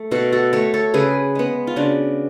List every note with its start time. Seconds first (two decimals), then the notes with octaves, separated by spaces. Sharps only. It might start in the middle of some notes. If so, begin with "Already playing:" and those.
Already playing: A3
0.11 B2 F#4 A4
0.32 F#4 A4
0.53 A3 A4 C#5
0.74 A4 C#5
0.94 C#3 G#4 B4
1.35 G#3 B3
1.67 F4
1.76 C#3 D4 F#4